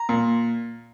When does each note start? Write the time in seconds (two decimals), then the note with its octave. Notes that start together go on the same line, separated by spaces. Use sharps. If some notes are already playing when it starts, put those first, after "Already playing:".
Already playing: A#5
0.09 A#2